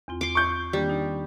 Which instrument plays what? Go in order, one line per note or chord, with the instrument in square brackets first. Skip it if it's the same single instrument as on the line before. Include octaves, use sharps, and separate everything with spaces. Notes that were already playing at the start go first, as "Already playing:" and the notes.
[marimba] E2 C4 F4
[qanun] C6 D6
[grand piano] C#6 G6
[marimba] D#3 A#3 D4 [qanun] G3
[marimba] D#4